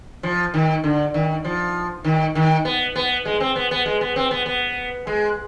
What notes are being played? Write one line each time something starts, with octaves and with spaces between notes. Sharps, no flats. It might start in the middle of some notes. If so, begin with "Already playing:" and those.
F3
D#3
D3
D#3
F3
D#3
D#3
B3
B3
G#3
C4
B3
B3
G#3
B3
C4
B3
B3
G#3